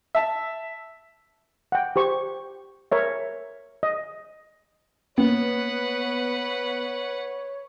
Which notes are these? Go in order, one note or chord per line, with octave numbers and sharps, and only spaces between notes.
E5 A5
F#5 G5
G4 C5 C#6
A#4 C#5 E5
D#5
A#3 B3 B4 C#5 F#5